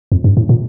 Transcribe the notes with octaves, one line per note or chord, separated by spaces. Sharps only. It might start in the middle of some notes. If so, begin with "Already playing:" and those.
F2
G2
A2
A#2